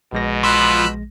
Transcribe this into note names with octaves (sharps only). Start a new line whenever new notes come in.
A#1 B2 G#3 A#6
F3 B5 E6 F#6